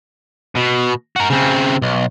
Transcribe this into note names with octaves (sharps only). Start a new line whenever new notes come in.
B2
F#4 A#4
C#3 C4
B1